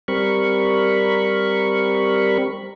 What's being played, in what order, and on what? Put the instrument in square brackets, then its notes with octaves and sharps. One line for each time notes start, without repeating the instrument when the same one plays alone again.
[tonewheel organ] G3 C4 A#4 B5 C#6